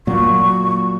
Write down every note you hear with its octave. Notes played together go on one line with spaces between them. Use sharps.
A#2 F#3 C#6